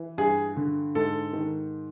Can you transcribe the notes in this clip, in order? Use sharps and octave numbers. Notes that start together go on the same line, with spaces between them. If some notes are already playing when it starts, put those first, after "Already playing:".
Already playing: E3
G2 G#4
D3
G#2 A4
D#3